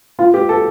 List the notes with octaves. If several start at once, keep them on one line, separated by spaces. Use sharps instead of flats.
F4
G4
A4